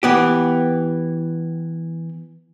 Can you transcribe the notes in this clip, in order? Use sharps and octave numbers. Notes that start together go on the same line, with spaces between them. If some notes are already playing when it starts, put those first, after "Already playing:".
E3 B3 G4